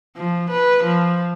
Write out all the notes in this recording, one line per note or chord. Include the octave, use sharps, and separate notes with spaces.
F3
B4
F3